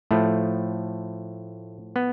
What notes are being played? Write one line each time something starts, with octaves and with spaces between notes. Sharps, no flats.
A2 F3 A3
B3